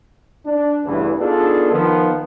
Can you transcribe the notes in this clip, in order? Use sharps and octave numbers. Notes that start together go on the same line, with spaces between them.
D4
A1 E2 G2 C#3 E3
B3 D4 D#4 F4 G#4 A4
D#3 F3 B3